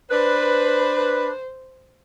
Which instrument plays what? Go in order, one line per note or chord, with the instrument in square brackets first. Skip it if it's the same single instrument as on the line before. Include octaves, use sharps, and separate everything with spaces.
[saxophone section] D4 B4 [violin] C5